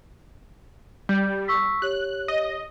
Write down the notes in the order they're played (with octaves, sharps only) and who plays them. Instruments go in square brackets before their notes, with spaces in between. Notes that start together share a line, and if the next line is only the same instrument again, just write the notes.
[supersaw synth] G3 [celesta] G6
[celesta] C#6 E6 B6
[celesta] G4 C#5 [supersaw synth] F#6
[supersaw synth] D#5